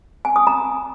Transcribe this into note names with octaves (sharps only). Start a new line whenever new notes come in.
G#5
D#6
A#5